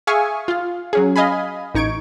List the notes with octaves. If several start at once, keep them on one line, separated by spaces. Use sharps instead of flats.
G#4 E5 F5 G#5 C#6 D#6
F4 F5
F#3 C#4 G#4
D#5 F5 G#5 B5
A1 D#4 C#6 G#6 D7